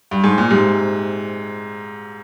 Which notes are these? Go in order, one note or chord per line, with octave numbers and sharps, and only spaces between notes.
G2
G#2
A#2
G#2 C3